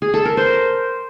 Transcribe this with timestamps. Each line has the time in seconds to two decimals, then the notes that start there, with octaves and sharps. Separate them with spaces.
0.02 G#4
0.14 A4
0.25 A#4
0.37 C5